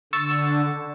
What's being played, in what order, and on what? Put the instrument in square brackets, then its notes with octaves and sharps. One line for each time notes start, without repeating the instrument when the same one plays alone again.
[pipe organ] D3 [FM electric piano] C#6 E6 A6